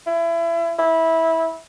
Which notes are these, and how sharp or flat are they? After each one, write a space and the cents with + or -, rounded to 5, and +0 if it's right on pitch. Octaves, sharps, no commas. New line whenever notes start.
E4 +30
E4 -15